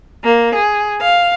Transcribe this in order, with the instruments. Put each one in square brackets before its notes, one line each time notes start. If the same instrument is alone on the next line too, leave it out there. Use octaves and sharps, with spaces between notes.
[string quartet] A#3
G#4
F5